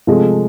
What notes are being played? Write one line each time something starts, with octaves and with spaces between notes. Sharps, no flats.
C3 F3 G#3 A3